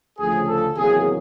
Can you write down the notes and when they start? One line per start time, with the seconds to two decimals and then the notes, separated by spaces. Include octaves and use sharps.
0.19 D2 C#3 F3 G#4
0.48 A4
0.76 E2 C3 D#3 F#3 A#3 G#4